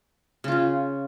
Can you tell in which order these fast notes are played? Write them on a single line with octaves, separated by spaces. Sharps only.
C#3 F4 C#4